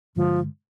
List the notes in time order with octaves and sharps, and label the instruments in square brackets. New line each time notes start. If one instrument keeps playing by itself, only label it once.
[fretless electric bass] G2 D3 G#3 [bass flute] F3